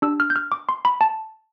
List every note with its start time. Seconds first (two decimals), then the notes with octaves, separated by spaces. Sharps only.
0.02 D4 G4 E6
0.20 F6
0.30 G6
0.36 F6
0.52 D6
0.69 C6
0.85 B5
1.01 A5